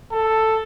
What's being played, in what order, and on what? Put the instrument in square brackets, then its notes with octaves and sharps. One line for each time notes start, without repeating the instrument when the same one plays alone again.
[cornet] A4